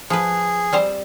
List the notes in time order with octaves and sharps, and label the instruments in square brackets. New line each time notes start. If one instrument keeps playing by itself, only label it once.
[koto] F3 B4 [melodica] G#4
[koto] G3 C4 C5